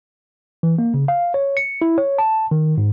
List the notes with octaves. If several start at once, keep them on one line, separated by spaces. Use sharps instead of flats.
E3
A#3
C#3
F5
C#5
C#7
E4
C#5
A5
D#3
G#2